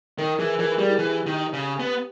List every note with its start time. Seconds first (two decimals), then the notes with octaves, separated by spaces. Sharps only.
0.18 D#3 A#4
0.39 E3 G#4
0.60 E3 A#4
0.79 G3 G#4
0.90 E4
0.99 E3 G4
1.26 D#3
1.53 C#3
1.80 B3